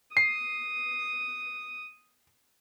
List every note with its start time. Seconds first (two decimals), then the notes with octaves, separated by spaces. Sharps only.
0.17 D#6 C7